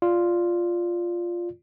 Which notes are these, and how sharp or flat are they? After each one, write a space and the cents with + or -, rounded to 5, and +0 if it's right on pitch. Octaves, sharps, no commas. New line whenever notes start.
F4 +0 D5 +0